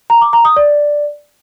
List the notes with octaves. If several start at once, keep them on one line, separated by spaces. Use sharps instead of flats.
A#5
D6
A#5
D#6
D5